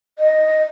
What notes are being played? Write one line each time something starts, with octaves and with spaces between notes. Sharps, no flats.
D#5